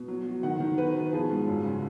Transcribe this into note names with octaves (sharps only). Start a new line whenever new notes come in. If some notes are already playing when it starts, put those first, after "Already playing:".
Already playing: B2
F#3
F#3
D#3 F#5
D#3
B2 B4
B2
F3 G#4
G#2
F#2
C#3